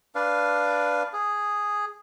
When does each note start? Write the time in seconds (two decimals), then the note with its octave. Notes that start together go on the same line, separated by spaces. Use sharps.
0.15 D4 B4 D5 F5
1.13 G#4